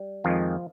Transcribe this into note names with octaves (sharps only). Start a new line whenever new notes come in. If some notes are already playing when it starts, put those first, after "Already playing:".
Already playing: G3
F2 D#3 F3 G#3 F4